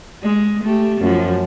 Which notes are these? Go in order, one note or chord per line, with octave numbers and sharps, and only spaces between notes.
G#3
A3 G4
F#2 F3